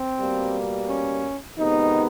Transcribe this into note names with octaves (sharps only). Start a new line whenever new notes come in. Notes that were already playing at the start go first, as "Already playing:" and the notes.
Already playing: C4
B2 G3 A#3
C#4
F2 C3 D#3 G#3 B3 D#4